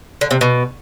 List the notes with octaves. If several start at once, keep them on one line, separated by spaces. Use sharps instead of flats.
D3
C3
B2